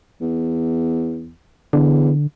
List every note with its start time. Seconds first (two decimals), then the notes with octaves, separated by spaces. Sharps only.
0.21 E2
1.73 E2 D3